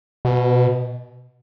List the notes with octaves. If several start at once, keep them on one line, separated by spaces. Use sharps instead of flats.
B2